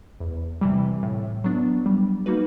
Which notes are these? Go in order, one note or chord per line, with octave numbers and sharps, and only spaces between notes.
E2
C3 E3 G3
A2
F#3 B3 D4
G3
A#3 D#4 F#4 B4